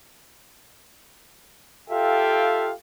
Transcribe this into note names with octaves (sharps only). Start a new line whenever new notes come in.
F4 G4 A4 E5 F5 G5